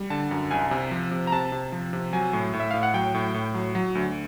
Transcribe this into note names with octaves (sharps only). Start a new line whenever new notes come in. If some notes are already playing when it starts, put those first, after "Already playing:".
Already playing: G3
D3 A5
F#2
C2 G#5
C3
F3
C3
A#5
C3 A5
C3
F3
C3
F#3 G#5
A2
A2
E5
A2 F5
F#5
F#3 G5
A2
A2
F#3
F#3
D2